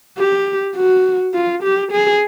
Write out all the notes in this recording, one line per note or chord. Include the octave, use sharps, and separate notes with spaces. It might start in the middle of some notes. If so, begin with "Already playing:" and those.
G4
F#4
F4
G4
G#4